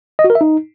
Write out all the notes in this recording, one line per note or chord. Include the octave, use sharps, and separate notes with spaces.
D#5
F#4
A#4
E5
D#4